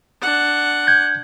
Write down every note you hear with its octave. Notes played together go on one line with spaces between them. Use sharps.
D4 F#5
G6 G#6